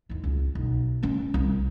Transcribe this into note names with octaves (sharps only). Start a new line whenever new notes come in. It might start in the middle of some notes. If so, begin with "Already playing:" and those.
E2 D#3
C#2
B1
G#3 C#4
C2